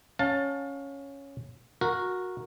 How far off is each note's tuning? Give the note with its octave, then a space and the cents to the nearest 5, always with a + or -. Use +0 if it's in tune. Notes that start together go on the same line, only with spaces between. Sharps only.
C#4 +0 F5 +30 A5 +10
F#4 -15 A#4 +0